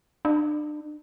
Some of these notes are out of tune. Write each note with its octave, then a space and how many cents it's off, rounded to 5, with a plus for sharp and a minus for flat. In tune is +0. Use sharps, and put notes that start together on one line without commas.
D4 +35